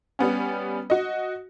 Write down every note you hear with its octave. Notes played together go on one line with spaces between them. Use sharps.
G3 B3 C#4
F#4 D#5